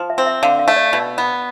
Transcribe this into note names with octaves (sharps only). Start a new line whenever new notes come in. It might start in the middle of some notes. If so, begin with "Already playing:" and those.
Already playing: F3
E5
C4
E5
D3 F5
F5
A3
D5
B2
B3